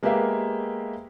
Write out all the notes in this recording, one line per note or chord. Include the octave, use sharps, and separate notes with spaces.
G#3 A#3 B3 G4 E5 F5